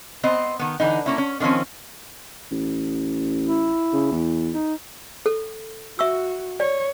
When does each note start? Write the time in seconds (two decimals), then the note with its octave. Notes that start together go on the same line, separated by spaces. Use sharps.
0.23 B3 C4 C5 D#5
0.59 D#3 B3
0.80 D3 E3 D#4
1.06 A#3 C#4 E4
1.18 C#4
1.40 D3 D#3 F3 C4 C#4
2.51 A1
3.46 E4
3.93 C#3
4.11 E2
4.52 D#4
5.26 A4
5.99 F#4 E5 C#6 E6
6.60 C#5 D5